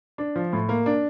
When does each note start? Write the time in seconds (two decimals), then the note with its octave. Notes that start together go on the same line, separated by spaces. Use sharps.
0.18 D4
0.36 F3
0.53 A2
0.69 A#3
0.86 D4